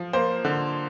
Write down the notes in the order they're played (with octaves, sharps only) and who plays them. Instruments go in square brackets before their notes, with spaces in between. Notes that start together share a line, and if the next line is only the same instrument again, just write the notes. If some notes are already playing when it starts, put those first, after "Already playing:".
Already playing: [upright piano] F3
A#3 C5
D3